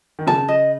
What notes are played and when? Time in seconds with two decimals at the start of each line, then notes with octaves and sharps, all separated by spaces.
0.19 D#3
0.27 C#3 A5
0.48 D#5